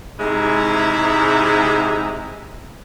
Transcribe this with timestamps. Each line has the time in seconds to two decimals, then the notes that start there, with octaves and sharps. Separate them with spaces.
0.20 G#2 C3 G#3 E4 A#5